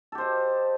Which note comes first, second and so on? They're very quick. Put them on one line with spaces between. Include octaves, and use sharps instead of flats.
A4 G4 C5 D#5